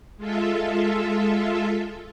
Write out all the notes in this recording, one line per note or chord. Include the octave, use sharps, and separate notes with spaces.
G#3 F4 A4 E5